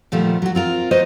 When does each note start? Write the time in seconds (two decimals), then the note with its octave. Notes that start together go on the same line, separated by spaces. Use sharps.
0.12 A#2 D#3 F3 G3 A3 B3
0.42 F#3 F#4
0.55 C4 F4 A#4
0.91 F#4 B4 C5 D#5